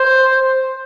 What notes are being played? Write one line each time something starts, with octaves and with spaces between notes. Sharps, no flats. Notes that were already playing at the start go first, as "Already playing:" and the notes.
Already playing: C5